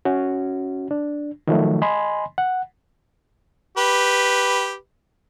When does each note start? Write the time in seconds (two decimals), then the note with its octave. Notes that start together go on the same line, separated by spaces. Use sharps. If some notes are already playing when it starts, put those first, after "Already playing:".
0.05 C#4 F#4
0.91 D4
1.47 D#3 F3 F#3 A3
1.82 D#5 G#5 B5 C6
2.38 F#5
3.77 G4 B4